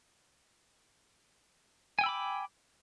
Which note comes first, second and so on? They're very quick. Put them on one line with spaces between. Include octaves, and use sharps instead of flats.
G#5 G5 E6 B5 D6